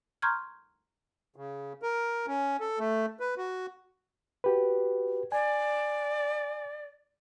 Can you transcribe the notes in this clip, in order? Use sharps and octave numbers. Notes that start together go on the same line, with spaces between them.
A#5 C6 C#6 F6 G6 G#6
C#3
A#4
C#4
A4
A3
B4
F#4
F#4 G4 B4
D5 G#5